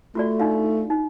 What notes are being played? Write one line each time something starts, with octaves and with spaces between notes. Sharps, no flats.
A3 F4 F#4 D5
D4 D#4 F5
D#4